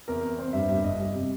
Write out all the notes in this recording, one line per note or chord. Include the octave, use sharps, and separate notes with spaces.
E2 A#4
E2
C4
G2 E5
G2 E5
G1 D#5
G3
C3